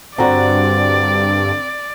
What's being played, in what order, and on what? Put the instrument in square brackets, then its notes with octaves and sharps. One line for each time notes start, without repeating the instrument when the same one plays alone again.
[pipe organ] G2 [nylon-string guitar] D3 F#4 [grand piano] C4 A#5 [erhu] D5